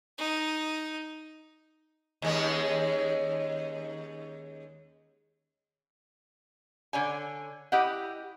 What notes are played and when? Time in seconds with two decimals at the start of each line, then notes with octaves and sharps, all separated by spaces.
0.18 D#4
2.22 D#2 G#3 C#4
6.93 D3 C#5 G#5
7.72 E4 G4 D#5 F#5